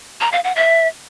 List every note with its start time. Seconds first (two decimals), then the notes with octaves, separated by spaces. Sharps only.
0.21 A#5
0.32 F5
0.44 F#5
0.56 E5